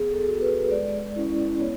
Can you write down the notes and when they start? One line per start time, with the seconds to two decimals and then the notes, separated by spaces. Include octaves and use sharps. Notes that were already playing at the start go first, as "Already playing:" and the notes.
Already playing: B3 G#4
0.11 A4
0.26 F#4
0.41 B4
0.71 G#3 D5
1.16 C#4 E4
1.60 B3 C#5